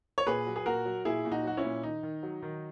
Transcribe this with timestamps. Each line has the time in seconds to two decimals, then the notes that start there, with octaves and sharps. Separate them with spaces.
0.18 C#5
0.26 A#2 G#4 B4
0.47 F#3
0.56 G#4
0.66 A#2 F#4 A#4
0.85 F#3
1.05 A#2 E4 G#4
1.25 A#2
1.31 D#4 F#4
1.44 F#3 F#4
1.57 C#4 E4
1.64 A#2
1.83 D#3 D#4
2.03 D#3
2.23 F#3
2.42 D#3